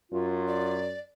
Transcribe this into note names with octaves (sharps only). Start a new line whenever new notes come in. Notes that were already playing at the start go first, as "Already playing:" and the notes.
F#2 F4
D5